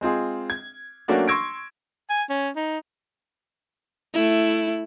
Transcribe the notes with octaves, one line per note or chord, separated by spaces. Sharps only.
G#3 C4 F4 G#4
G#6
F#3 A3 A#3 C#4 D4 F#4
C6 C#6 E6 G#6 A#6 D7
G#5
C#4
D#4
A3 E4